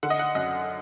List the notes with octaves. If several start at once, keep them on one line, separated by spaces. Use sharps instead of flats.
D3 F#5
D#5
F#5
F#2 D#5